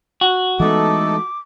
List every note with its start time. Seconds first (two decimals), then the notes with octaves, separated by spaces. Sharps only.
0.21 F#4
0.60 E3 G#3 A3 B3 D#4 A4 D6